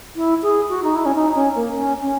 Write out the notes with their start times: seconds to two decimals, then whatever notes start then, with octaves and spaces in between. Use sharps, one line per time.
0.16 E4
0.42 G#4
0.69 F#4
0.83 D#4
0.95 E4
1.05 C#4
1.15 D#4
1.35 C#4
1.55 A#3
1.75 C#4
2.02 C#4